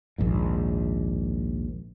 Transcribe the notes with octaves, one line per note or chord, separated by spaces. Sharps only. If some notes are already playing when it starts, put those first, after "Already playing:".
A#1 D#2 G#2